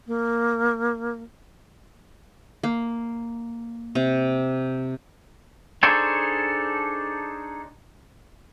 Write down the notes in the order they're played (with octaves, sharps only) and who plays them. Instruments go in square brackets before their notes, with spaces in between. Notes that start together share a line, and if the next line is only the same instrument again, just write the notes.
[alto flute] A#3
[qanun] A#3
C3
[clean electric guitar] D4 D#4 G#4 A4 C5 C#5